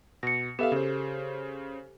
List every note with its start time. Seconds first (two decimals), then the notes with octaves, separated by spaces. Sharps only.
0.23 B2 A#6 C#7
0.59 B3 G4 A4 E5 F5
0.72 C#3 C5